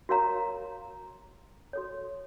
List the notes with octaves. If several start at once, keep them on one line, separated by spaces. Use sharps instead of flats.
F#4 A#4 C#5 F5 A#5
F#4 A4 C#5